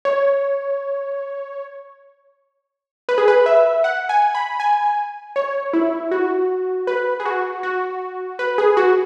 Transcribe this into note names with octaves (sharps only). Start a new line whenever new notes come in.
C#5
B4
G#4
B4
E5
F#5
G#5
B5
G#5
C#5
E4
F#4
B4
G#4
F#4
F#4
B4
G#4
F#4